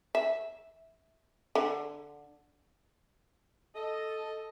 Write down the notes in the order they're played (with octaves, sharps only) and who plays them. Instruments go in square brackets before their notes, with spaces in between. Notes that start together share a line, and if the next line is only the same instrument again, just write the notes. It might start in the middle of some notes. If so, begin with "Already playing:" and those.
[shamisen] E5
D3
[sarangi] A4 [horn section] D#5